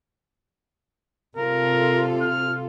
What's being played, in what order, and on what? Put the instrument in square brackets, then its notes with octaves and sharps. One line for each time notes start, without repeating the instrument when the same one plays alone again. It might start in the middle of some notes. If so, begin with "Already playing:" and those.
[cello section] C3 F4 A4 [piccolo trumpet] A#4
[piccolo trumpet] F6